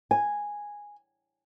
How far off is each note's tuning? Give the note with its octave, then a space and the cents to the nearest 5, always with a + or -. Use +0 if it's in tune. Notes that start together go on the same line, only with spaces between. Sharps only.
G#5 -5